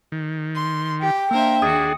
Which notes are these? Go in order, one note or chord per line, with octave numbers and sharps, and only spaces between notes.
D#3
C6
G4 G5
A#3 D4 A#4 C5 E5
D#2 D4 F#4 G#4 D#6 C#7